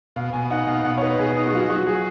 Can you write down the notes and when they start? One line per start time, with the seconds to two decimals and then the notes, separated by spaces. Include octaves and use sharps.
0.16 B2 F5
0.33 B2 G#5
0.50 D#4 F#5
0.67 B2 F5
0.84 B2 F#5
0.98 C#5
1.01 D#4 B4
1.19 B2 G#4
1.36 D#4
1.46 F#4
1.53 F#3 F4
1.70 F#3 F#4
1.87 F#3 G#4